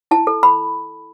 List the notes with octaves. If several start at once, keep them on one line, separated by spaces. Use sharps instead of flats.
E4 A5
A4
B5